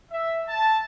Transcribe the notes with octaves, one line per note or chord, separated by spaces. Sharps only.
E5
A5